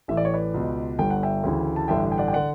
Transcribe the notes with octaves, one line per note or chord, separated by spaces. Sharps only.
A1 A2 E3 E5
D5
C#5
B4 D5
C#2 B2
G1 G2 D3 G5
F#5
E5 G5
D2 C#3 E3
A5
A1 G2 D3 E5 G5
G5
D5 F#5
G5
D3 D5 F#5